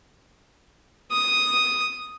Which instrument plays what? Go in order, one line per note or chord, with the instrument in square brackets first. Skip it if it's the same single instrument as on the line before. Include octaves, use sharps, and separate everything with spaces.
[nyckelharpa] D#6